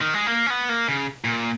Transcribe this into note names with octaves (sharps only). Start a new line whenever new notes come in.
D#3
G#3
A#3
C#4
B3
A#3
C#3
A#2